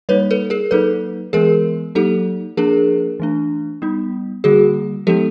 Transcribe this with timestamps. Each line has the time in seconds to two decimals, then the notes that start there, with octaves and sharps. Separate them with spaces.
0.09 G3 A#3 D#4 B4 C#5
0.31 A4 B4
0.50 G#4 A#4
0.71 F#3 A#3 D#4 A4 B4
1.33 E3 G#3 B3 G#4 A#4
1.95 F#3 A#3 D#4 G4 A4
2.57 F3 A#3 D4 G#4 A#4
3.20 E3 A3 D4
3.82 G3 B3 D#4
4.44 D3 G3 A#3 F#4 G#4
5.07 F3 G#3 B3 D#4 G4 A4